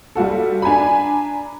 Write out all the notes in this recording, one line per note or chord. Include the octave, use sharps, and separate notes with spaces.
G3 F4 F#4 A4
D4 G#5 A#5 B5